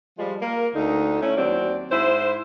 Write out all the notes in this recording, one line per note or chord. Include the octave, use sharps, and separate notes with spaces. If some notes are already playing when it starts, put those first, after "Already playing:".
F3 G3 G#3 F4
A#3 A#4
D2 D3 D#4
A3 C#4 E4
D#2 F#3 C4 D5
G#2 E4 C5